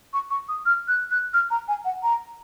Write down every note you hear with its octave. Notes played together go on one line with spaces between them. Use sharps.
C#6
C#6
D#6
F6
F#6
F#6
F6
A#5
G#5
F#5
A#5